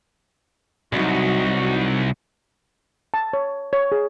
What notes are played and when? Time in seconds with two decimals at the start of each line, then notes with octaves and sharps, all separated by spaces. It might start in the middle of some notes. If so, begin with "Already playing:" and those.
0.93 C2 F#3 D#4 F#4
3.14 A5
3.33 C#5
3.73 C#5
3.92 G#4